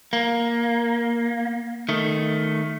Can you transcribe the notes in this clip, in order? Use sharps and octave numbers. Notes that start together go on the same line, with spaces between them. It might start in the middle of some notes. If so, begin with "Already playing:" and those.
A#3
D#3 A3